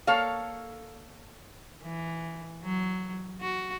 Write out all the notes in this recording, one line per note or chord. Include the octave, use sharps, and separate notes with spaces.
A#3 A4 C#5 F5
E3
F#3
F#4